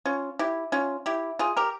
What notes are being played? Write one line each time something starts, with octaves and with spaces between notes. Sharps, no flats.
C#4 F4
E4 G4
C#4 F4
E4 G4
F4 G#4
G4 A#4